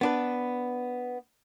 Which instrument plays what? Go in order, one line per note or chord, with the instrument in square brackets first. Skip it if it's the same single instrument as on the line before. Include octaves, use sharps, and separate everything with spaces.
[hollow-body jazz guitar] B3 D4 B4